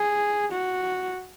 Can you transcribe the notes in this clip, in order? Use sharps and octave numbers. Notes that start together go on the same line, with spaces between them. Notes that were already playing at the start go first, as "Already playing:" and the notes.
Already playing: G#4
F#4